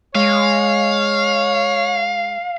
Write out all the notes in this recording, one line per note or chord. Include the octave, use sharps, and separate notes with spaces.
G#3 C#5 F5